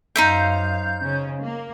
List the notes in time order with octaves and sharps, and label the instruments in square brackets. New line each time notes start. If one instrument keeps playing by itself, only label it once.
[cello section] F#2 F5 [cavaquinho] D#4 C5 E5 [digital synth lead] G6
[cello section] C#3 C#4
A#3